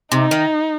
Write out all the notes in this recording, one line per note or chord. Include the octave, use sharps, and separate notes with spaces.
C3 D#4
D#3